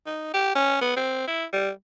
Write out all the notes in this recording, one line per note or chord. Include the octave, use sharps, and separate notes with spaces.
D#4
G4
C#4
B3
C4
E4
G3